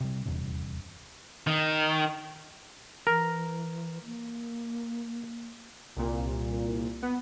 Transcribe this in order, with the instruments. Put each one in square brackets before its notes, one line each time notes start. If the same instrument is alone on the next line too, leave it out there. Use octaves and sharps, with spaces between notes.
[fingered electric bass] C3 G3
D#1 E2 G2 C3
[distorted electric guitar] D#3
[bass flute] E3 [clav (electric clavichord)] A#4
[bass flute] A#3
[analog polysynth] C2 A#2
B3